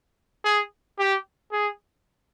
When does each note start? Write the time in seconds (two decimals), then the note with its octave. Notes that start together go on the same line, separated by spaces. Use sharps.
0.44 G#4
0.99 G4
1.52 G#4